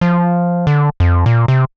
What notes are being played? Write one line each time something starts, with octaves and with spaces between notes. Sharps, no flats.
F3
D3
F2
A#2
C3